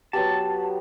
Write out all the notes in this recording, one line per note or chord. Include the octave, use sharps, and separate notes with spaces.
F#3 B3 G4 A5